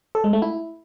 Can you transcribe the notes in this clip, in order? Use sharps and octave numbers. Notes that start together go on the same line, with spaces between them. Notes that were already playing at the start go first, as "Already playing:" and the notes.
A4
G#3
A3
E4